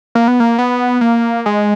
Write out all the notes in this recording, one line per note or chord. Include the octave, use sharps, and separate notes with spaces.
A#3
B3
A#3
B3
A#3
G#3